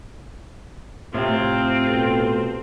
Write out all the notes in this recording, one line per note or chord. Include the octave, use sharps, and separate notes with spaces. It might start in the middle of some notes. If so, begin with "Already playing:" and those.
A2 C3 C4 F4
B2 G4 A4